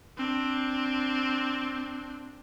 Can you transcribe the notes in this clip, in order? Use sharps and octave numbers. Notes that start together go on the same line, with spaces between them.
C4 D4